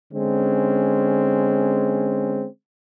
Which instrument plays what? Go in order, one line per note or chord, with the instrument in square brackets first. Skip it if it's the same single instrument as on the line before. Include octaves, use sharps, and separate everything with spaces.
[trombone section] D3 G#3 C4 C#4